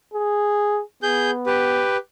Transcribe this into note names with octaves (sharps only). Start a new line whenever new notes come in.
G#4
B3 G#4 G6
G4 B4